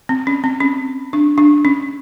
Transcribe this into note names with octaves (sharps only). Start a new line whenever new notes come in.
C4
C#4
C4
C#4
D4
D4
C#4